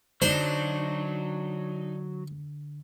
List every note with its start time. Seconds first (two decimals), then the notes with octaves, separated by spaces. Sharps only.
0.22 D3 F#3 D4 D#4 C5